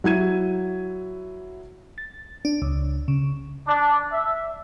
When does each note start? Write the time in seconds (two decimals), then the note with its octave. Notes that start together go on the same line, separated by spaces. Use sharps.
0.04 F#3 E4 G#6 D#7
1.98 A6
2.45 D4
2.62 C#2
3.08 C#3
3.67 D4
4.12 E5